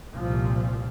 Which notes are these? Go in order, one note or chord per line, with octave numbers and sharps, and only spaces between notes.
C2 A#2 F3